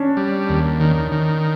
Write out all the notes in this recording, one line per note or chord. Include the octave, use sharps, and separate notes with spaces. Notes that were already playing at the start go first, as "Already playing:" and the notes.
Already playing: C#4 D4
G3
D#2
D#3
D#3